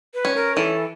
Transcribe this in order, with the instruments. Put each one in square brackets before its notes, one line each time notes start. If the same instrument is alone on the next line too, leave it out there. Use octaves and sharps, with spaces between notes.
[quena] B4
[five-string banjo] C#4
[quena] A#4
[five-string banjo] E3 [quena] A4